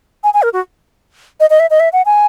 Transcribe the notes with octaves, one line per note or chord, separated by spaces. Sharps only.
G#5
G#5
A#4
F#4
D#5
D#5
E5
D#5
E5
F#5
G#5